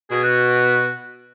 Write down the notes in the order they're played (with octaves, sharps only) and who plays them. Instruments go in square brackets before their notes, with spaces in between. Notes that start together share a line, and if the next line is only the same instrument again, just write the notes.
[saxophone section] B2 [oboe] G#4
[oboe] F#4